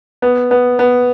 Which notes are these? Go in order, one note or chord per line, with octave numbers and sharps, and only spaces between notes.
B3
B3
B3